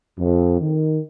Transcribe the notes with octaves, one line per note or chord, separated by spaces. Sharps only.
F2
D#3